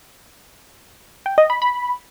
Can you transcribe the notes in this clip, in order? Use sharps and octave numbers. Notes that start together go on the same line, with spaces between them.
G5
D#5
B5
B5